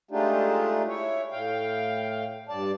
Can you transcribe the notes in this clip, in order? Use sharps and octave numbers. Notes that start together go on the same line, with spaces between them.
G#3 A3 D4 D#4 F4 G4
E4 C#5
A2 F5 G5
G2 D5 A5